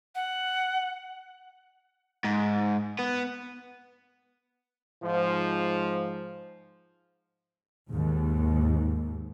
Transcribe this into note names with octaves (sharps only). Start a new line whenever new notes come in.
F#5
G#2
B3
G#2 F3
D#2 G#2